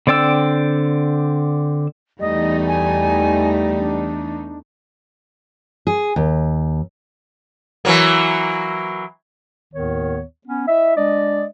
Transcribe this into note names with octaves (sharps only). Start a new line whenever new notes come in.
D3 C4 D5 G5 E6
E2 G3 A3 D#4 D#5
G#5
D4
G#4
D#2
E3 F#3 A#3
D#2 A2 D#3 B3 C#5
B3 C#4
E4 D#5 E5
G#3 D4 D5 D#5